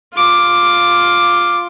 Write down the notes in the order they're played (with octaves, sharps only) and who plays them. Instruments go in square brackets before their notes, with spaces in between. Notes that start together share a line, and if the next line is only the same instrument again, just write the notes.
[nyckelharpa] F4 D6